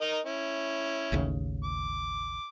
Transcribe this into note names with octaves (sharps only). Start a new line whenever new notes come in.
D#4 A#4 D#5
C#4 E4
A1 D#2 C#3
D6